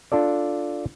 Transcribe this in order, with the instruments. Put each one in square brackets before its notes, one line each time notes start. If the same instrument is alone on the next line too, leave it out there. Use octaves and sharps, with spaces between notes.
[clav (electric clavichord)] D4 F4 A4 D5